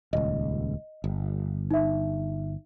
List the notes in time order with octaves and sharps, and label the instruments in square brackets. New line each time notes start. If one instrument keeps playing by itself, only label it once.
[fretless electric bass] D#1 C#2 [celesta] D#5
[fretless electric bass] G1
[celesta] D#4 E5